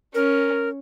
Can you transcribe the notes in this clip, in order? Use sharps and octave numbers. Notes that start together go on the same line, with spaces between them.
C#4 A#4